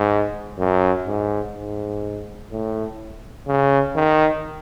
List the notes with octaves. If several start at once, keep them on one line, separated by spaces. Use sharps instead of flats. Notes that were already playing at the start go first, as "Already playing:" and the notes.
Already playing: G#2
F#2
G#2
G#2
A2
C#3
D#3